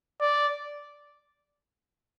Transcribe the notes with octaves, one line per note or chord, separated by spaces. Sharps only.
D5